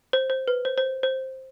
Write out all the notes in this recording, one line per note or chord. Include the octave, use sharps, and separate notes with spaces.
C5
C5
B4
C5
C5
C5